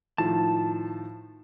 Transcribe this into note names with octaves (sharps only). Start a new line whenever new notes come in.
A2 D#3 F3 A5